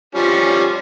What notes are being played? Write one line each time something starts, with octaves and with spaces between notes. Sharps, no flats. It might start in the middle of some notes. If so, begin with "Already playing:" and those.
F3 G3 C#4